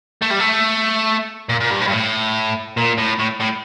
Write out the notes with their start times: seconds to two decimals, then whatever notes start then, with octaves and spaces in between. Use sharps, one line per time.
0.22 A3
0.30 G3
0.39 A3
1.49 A#2
1.60 A#2
1.70 G2
1.81 A2
1.87 G2
1.93 A2
2.77 A#2
2.98 A2
3.19 A2
3.41 A2